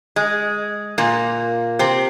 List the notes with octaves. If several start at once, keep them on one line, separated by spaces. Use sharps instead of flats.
G#3
A#2 A#3
C3 C4